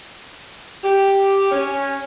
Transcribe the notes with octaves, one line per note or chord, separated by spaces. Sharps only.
G4
C#4